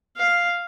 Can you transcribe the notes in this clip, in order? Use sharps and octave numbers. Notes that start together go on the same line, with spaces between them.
F5